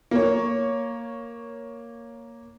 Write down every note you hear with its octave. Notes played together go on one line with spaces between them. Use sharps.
A#3 C#5